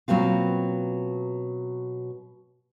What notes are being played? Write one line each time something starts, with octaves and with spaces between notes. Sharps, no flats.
B2 F#3 A#3 C4 F4